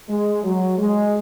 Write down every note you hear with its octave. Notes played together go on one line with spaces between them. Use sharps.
G#3
F#3
G#3